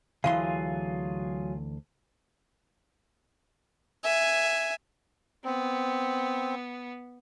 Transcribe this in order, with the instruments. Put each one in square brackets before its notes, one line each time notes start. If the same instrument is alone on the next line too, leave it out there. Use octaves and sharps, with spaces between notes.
[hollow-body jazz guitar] D2 E3 C6 [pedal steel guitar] F#3 F4 G#4 [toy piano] F5
[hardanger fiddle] E5 G#5
[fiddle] B3 [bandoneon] C4